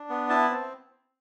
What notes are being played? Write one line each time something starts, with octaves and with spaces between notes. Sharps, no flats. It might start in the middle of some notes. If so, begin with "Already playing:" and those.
Already playing: D4
B3
E4 A5
C4